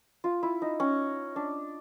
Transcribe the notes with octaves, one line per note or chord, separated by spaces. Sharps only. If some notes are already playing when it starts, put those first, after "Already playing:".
F4
E4
D#4
C#4
D4